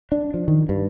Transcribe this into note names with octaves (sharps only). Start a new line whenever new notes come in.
D4
F3
D#3
G2